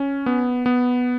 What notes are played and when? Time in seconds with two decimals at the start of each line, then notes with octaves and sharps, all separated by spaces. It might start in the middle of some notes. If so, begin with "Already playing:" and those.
Already playing: C#4
0.26 B3
0.66 B3